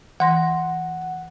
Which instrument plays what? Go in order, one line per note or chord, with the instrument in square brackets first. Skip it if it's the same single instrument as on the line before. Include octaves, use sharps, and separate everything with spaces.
[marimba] E3 C6 A#6 [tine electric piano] F#5